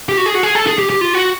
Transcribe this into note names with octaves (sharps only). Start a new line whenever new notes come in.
G4
F#4
G#4
F#4
G#4
A4
G#4
G4
G4
F4
F#4